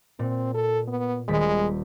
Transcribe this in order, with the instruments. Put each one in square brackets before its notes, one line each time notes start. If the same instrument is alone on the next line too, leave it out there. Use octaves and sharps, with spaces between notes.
[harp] A#2 [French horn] C4
[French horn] A4
B3
[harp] D#1 B6 [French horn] G#3